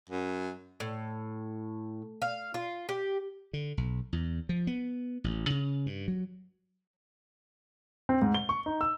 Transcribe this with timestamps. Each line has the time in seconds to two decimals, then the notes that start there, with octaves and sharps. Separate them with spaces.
0.09 F#2
0.80 A2
2.22 F5
2.54 F4
2.89 G4
3.53 D3
3.77 B1
4.13 E2
4.49 F3
4.67 B3
5.24 A1
5.50 C#3
5.86 G2
6.08 F#3
8.09 C4
8.22 G#2
8.35 G7
8.49 C#6
8.66 D#4
8.81 E6